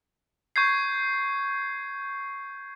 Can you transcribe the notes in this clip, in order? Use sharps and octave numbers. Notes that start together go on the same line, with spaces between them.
C#6 G6 G#6 C7